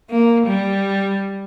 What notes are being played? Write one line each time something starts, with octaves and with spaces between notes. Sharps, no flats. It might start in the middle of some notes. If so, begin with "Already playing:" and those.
A#3
G3